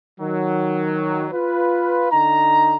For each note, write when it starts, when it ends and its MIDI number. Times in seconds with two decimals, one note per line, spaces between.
0.20 1.28 51
0.20 1.28 54
1.33 2.10 65
1.33 2.10 71
2.12 2.76 50
2.12 2.76 63
2.12 2.76 82